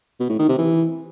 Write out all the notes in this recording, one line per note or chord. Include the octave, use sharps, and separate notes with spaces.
B2
A2
D#3
C3
E3